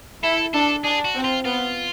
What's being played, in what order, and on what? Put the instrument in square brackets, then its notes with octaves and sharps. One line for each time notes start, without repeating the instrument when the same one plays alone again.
[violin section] E4 [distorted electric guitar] A4
[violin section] D4 [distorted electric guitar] A4
[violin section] D4 [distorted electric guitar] G#4
[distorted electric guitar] F#4
[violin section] C4
[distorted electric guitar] F4
[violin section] B3 [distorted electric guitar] F4